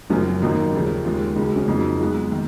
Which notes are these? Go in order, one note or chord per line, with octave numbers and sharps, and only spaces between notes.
F#1 F#2 F3 C#4
G#1 F#2 D#3 A#3 D#4
D#2 C#3 F3
D#2 C#3 G#3 F4
C#2 C#3 F#3
C#4
F2 C#3 F#3 A#3 D#4
B1 B2 G#3 B3
D#3 A#3